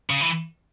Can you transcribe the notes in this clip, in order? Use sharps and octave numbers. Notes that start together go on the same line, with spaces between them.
C#3
E3